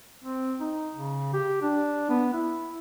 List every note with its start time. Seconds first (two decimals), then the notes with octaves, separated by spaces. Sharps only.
0.24 C4
0.60 D#4
0.95 C#3
1.34 G4
1.62 D4
2.09 B3
2.33 E4